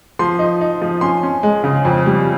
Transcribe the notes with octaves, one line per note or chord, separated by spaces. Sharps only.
F3 C6
D#4
D#4
F3
C#4 C6
C#4
G#3
C#3
F2
G3